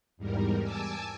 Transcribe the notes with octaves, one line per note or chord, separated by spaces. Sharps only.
E2 G#2 G3 A#4
G#5 A5 D6 E6